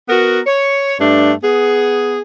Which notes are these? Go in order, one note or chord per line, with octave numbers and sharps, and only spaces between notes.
B3 F#4 A#4
C#5
G2 A3 D4
B3 G#4